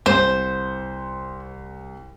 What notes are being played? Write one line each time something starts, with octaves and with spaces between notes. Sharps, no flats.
C2 C5